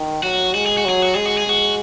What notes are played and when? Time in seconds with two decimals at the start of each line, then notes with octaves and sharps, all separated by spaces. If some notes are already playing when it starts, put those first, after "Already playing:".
Already playing: D#3
0.23 F#3 F#4
0.54 G#3 F#4
0.66 G#4
0.78 F#4
0.85 F#3 G#4
1.02 F#4
1.14 G#3 G#4
1.26 F#4
1.38 G#4
1.46 G#3 F#4